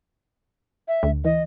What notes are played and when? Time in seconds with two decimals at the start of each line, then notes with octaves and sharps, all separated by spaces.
0.88 E5
1.03 D2
1.25 E3 D#5